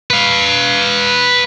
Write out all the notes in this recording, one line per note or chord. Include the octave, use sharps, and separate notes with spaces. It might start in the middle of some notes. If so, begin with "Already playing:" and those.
B4 F5